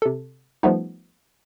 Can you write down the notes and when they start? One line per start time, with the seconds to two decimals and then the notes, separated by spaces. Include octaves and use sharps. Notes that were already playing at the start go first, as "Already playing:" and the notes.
0.02 C3 A4
0.63 F3 G3 A3 B3 D#4